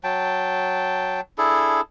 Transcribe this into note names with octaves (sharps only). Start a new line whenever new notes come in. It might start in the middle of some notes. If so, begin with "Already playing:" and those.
F#3 G5 A5
D4 E4 G#4 A4